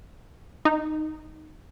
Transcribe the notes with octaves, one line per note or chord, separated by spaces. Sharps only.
D#4